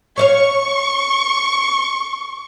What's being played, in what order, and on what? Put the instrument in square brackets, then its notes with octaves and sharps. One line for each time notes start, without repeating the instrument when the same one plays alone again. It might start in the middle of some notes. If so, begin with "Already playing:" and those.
[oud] C#5 D#5 F5 [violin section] C#6